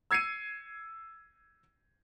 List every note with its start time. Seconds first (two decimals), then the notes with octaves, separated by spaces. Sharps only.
0.11 E6 G#6 C7 C#7 D#7